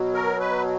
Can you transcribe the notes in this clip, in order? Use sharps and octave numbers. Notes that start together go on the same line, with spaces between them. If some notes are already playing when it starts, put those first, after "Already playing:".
Already playing: B2 F#3
A#4
B4